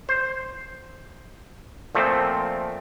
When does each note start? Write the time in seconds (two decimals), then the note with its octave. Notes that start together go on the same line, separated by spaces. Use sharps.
0.09 C5
1.95 A#2 F3 A3 C4